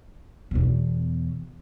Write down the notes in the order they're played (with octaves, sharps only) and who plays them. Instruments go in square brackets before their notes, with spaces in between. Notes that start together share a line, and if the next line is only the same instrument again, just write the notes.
[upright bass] E2 B2